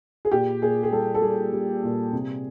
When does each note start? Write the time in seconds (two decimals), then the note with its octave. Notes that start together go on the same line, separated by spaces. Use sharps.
0.25 G#4
0.31 A#2 G4
0.62 A#2 G#4
0.83 G#4
0.91 G3 A4
1.15 A4
1.22 G3 G#4
1.53 G3
1.83 A#2
2.13 C3